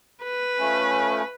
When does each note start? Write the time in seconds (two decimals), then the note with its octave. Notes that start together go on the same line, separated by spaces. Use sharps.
0.24 B4
0.59 F3 A3 C#4